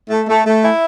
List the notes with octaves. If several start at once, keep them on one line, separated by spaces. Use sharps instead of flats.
A3
A3
A3
E4